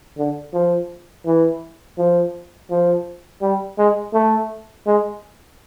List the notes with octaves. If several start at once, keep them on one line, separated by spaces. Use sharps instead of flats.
D3
F3
E3
F3
F3
G3
G#3
A3
G#3